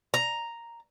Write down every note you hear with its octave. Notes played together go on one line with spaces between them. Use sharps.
A#5